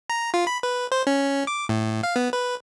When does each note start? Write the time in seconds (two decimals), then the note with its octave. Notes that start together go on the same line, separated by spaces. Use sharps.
0.10 A#5
0.34 F4
0.47 B5
0.63 B4
0.92 C5
1.07 C#4
1.47 D6
1.69 A2
2.03 F5
2.16 B3
2.33 B4